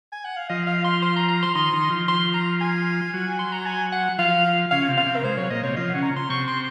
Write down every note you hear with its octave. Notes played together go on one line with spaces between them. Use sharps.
G#5
F#5
F5
F3 F4 D#5
F5
C6
C6
A#5
A#5
C6
D#3 D#4 C6
D#3 D#4
F3 F4
C6
A#5
G#5
F#3 F#4
C6
A#5
G#5
F#5
F3 F4 F5
C#3 C#4 F5
C3 C4
F5
C3 C4
A#4
G#3 C5
F#3 C#5
A#2 A#3 D#5
C3 C4 C#5
F3 F4 D#5
F#5
C#3 C#4
A#5
C6
C3 C4 C#6
C6